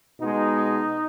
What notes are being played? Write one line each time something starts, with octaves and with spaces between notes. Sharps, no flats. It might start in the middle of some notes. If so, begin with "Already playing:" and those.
B2 G#3 D#4